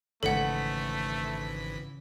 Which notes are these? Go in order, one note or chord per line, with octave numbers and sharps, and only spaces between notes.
G#1 C#3 E3 G#3 A3 A4 F#5 B6